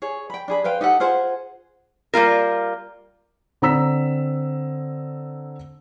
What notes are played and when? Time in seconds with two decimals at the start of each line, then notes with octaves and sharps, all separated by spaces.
0.02 G#4 C#5
0.30 G5 B5
0.48 D4 G#4 B5
0.64 B4 C5 F5 G5
0.81 D#4 G4 A4 F#5
1.00 F4 G#4 C5 F#5
2.14 G3 A#3 F4 A#4
3.62 D3 C4 A#5 E6 B6